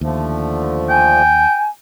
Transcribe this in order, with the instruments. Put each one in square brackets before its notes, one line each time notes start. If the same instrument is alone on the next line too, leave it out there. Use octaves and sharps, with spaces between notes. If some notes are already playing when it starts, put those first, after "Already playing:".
[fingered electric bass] D#2 [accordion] D3 F3 A3
[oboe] G5 [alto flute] G#5